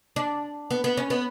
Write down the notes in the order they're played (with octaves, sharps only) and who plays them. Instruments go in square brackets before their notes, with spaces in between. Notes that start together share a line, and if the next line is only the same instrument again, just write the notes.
[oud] D4
B3
B3
C#4
B3